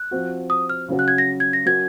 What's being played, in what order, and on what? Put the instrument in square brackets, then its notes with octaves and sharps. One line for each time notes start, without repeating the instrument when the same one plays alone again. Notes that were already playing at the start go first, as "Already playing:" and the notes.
Already playing: [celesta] F#6
[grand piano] F3 C4 F#4
[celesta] D#6
F6
[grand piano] C#3 F#3 C#4 F#4
[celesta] F#6
G#6
A#6
G#6
A#6
[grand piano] F#3 C#4 F#4 A#4 [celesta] G#6